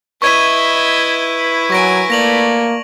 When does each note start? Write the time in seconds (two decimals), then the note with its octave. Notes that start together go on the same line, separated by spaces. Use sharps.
0.22 E4 B4 D#5 E5 C#6 G#6 D#7
1.70 F#3 A#4 G#5 C#6 A#6 D7
2.10 A3 A#3 D5 A#6 F7 F#7